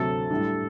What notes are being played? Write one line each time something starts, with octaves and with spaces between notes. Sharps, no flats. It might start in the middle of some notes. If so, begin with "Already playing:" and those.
Already playing: D2 C3 F#3 C4 F#4 A4
A2 G3 D4